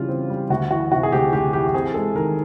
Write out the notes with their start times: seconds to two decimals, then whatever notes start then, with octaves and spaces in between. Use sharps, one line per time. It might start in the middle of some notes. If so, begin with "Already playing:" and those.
Already playing: C#3 E3 G3 F4
0.09 C4
0.30 G3
0.50 D2 F#4
0.71 E3 F#4
0.91 C3 F#4
1.03 G#4
1.12 D2 G4
1.33 D2 G4
1.53 E3 G4
1.68 G4
1.74 C4 G#4
1.94 G#3 A4
2.15 D#3 A#4